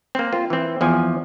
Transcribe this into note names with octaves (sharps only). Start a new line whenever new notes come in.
A#3 C4
F4
E3 C4
E2 F3 G#5